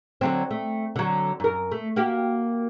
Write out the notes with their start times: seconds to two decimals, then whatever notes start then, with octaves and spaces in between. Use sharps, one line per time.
0.21 D3 F#3 C4
0.51 A3
0.96 D3 F#3
1.40 F#2 A#4
1.71 A3
1.96 A#3 F#4 G4